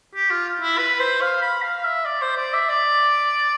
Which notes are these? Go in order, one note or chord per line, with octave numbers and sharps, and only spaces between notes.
G4
F4
E4
B4
C5
F5
B5
F5
E5
D5
C5
D5
E5
D5